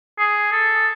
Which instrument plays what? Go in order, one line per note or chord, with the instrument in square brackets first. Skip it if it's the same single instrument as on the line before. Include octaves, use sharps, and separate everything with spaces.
[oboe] G#4
A4